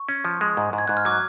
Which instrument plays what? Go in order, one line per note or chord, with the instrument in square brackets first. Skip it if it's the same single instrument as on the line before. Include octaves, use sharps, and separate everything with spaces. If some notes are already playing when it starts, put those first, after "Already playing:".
Already playing: [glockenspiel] C#6
[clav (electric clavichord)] C#4
F3
G#3
G#2
G#2
[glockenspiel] G#6
[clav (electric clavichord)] G#2 [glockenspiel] F#6
[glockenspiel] F6
[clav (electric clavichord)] F#3 [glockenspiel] D6